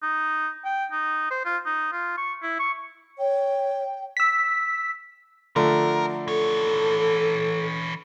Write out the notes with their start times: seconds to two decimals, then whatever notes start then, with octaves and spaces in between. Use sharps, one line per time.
0.02 D#4
0.65 G5
0.92 D#4
1.31 C5
1.45 F4
1.65 D#4
1.92 F4
2.18 C#6
2.42 E4
2.59 C#6
3.18 C#5 G5
4.17 E6 B6
5.56 D3 F3 A3 A#4
6.28 E3 A4 C#5